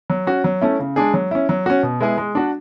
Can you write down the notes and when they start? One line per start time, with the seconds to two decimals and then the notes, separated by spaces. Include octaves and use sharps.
0.10 F#3
0.27 C#4 F#4
0.44 F#3
0.61 A3 C#4 E4
0.79 C#3
0.96 G#3 D4 G#4
1.14 F#3
1.31 C#4 E4
1.49 F#3
1.66 C#4 F#4
1.83 B2
2.00 G#3 B3 E4 G#4
2.18 G#3
2.35 D4 F#4